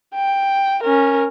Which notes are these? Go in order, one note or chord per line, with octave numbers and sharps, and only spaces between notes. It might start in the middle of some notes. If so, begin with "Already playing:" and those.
G5
C#4 A#4